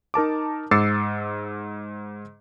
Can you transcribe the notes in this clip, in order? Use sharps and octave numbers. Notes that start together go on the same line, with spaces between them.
D#4 A#4 A5 D6
G#2 D6 E6 A6 C7 C#7